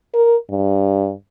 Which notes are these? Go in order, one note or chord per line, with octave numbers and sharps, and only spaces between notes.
A#4
G2